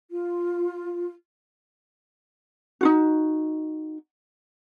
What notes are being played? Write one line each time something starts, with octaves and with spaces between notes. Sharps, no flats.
F4
D#4 F4 F#4